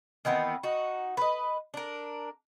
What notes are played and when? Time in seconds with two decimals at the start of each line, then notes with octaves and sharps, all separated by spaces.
0.25 D#3 E3 B3 C4
0.63 D#4 F#4
1.17 B4 D#5
1.74 D4 A#4